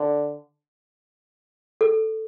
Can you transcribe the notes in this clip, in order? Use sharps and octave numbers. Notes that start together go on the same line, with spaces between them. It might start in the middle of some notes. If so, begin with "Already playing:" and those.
Already playing: D3
A4